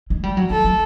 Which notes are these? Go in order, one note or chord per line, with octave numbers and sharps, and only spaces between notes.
G#3
G3
F#3
F3 A4
F#3